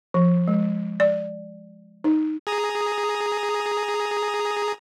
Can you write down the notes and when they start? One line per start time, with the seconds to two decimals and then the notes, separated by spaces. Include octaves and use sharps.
0.14 F3
0.47 G#3
1.00 D5
2.04 D#4
2.47 G#4 A#5 D#6